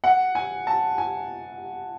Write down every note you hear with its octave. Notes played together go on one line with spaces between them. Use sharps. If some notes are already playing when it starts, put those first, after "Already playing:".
F#5
G#5
A5
G#5